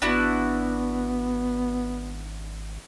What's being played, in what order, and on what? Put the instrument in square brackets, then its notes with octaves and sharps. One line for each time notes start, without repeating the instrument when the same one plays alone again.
[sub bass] G#1 [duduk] B3 [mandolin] D4 E4 F#4